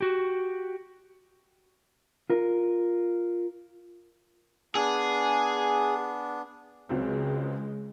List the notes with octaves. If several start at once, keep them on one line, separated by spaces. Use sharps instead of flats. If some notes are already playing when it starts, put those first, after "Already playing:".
F#4 G4
F4 A#4
B3 D4 G#4
C#2 C#3 F#3 G#3 C4